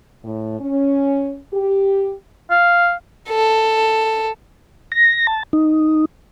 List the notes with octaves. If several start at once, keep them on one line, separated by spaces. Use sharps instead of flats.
A2
C#4
G4
F5
A4
A#6
A5
D#4